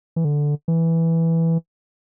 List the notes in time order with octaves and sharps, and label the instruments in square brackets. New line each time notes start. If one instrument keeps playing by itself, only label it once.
[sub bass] E3
D3
E3